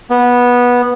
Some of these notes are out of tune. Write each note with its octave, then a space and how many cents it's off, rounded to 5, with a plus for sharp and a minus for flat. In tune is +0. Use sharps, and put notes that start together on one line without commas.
B3 -15